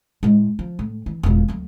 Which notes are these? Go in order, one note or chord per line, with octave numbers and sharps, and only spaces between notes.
A2 G#3
F3
A2
E3
E1 A#2
D2 F#3